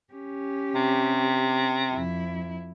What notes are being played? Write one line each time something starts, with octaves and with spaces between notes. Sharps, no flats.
C#4 G4
C3
F2 E4